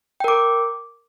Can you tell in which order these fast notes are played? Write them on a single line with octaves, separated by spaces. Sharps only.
G5 A#4 D6